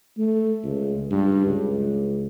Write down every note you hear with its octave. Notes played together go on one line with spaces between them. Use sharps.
A3
C#2
G2
C#2